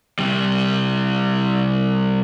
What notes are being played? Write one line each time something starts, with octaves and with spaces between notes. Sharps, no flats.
C3 G3